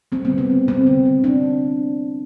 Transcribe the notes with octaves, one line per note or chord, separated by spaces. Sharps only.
G3 C4
B3
D3
C4
G3
G3 C4
D3
D3
D3 D4